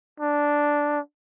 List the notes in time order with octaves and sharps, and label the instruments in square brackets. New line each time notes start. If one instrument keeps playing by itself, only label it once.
[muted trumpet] D4